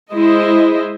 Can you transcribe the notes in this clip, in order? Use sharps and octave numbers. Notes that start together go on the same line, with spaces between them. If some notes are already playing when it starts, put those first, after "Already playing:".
G#3 E4 C5 D#5